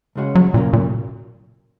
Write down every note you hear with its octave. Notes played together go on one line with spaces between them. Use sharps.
C#2 C#3 G#3 C#4 F#4
F#3
A#2 C#3 F#3 A#3
A#2